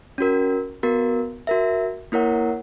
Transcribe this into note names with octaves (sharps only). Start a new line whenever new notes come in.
C#4 F#4 A#4
B3 F#4 A#4
F#4 A#4 E5
A#3 E4 A#4 C#5 F#5